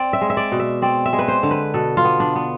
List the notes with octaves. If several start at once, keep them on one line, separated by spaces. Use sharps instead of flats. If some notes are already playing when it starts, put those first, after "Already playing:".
Already playing: C4 D5
E5
G#3
E5
D5
B2
E5
C4 D5
E5
G#3
B4
C5
D3
B4
B2 A4
F4
B3
D4
B3